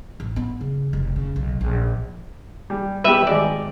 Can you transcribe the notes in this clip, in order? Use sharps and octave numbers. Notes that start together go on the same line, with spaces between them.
A1
B3
C#3
F1
C#3
B1
A#1
G3
G3 B3 G4 B4 E5
G#1 G4 D5 D#5